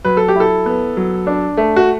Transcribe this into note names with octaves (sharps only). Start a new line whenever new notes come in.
F#3 B4
A4
G4
E4 A4
B3
F#3
D4
A3
F#4